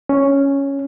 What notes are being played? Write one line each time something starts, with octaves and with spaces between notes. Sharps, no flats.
C#4